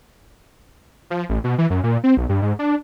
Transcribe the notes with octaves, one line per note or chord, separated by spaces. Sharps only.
F3
A1
B2
E3
F#2
A#2
C4
B1
G2
G#2
D4